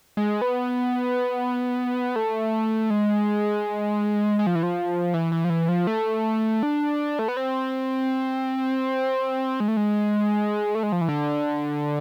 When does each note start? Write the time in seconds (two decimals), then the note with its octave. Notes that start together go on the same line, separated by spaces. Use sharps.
0.17 G#3
0.41 B3
2.16 A3
2.90 G#3
4.39 G#3
4.47 F3
4.55 E3
4.63 F3
5.14 E3
5.32 E3
5.44 F3
5.50 E3
5.68 F3
5.87 A3
6.63 D4
7.19 A3
7.28 B3
7.37 C4
9.60 G#3
9.68 A3
9.77 G#3
10.75 A3
10.83 G#3
10.92 F3
11.01 E3
11.09 D3